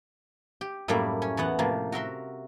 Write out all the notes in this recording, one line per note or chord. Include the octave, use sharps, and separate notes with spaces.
G4
F#2 A2 G3 A3 A#3 E4
C#4
E2 E3 B3 F#5
A2 C3 F3 A#3
F#4 A#4 E5 C6